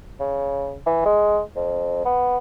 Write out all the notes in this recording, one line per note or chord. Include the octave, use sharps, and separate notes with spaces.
C#3
E3
G#3
F2
B3